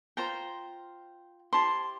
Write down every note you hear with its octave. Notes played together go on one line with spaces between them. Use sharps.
F4 C5 G5 A#5
E4 G4 C5 A5 C6